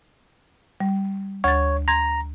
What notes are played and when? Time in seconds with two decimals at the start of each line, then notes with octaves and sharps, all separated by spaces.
0.80 G3
1.44 D2 C#5 A6
1.88 A#5 C6 G#6